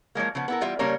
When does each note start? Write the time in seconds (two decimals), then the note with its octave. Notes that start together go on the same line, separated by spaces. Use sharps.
0.15 F3 F#3 G#3 A#3
0.35 C#3 F3 B3
0.48 B3 E4 A#4
0.61 E3 G3 F4 E5
0.79 C#3 G3 A#3 C#4 A#4 C#5